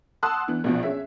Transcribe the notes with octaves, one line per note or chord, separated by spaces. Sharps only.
F#5 A5 C6 D#6 E6 F#6
E3 B3 D4
A#1 B2 F3
C#4 G#4 E5